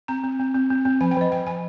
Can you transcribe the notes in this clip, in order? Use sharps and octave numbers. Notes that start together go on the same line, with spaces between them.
C4 A#5
C4
C4
C4
C4
C4
F3 G#5
G5
F3 D#5
F3 G5
F3 G#5